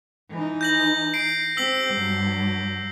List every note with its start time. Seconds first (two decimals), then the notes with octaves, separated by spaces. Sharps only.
0.30 E3 D#4
0.61 G6 A#6 F#7
1.14 C7 D7
1.57 C4 G4 E6 B6 F#7
1.94 G2 F#3